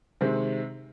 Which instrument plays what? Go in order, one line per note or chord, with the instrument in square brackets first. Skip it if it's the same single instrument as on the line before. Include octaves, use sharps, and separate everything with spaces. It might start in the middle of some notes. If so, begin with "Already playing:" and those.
[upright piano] C3 D#3 G#3 C4